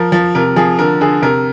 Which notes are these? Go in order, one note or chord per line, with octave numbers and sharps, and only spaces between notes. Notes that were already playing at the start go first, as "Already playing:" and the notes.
Already playing: F3 A#4
F3
C3 A#4
F3 G#4
D3 A#4
D3 G#4
C3 A#4